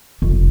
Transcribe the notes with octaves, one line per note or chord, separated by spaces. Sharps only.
F1